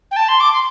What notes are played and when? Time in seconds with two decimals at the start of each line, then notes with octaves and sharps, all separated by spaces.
0.11 G5
0.16 A5
0.28 C6
0.40 D6
0.53 C6